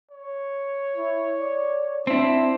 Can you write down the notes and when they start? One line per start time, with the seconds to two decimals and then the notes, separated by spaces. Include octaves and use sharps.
0.11 C#5
0.96 E4
1.40 D5
2.07 C4 D4 E4 C5